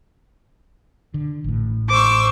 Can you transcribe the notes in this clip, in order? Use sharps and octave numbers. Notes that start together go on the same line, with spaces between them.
D3
A1 A2
C5 C#6 D6 E6